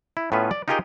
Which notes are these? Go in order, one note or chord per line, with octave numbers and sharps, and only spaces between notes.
E4
A2 B3 C#4 F4 B4 E5
D5
D#4 F4 G4 G#4 A#4 D#5